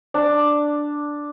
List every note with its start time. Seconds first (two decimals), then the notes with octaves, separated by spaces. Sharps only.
0.14 D4